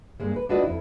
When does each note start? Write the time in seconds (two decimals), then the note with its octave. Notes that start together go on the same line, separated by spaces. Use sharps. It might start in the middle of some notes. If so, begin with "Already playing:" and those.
0.20 G2 G#3 A#3
0.36 B4
0.49 D4 F4 F#4 B4 D5 D#5
0.64 F2 E4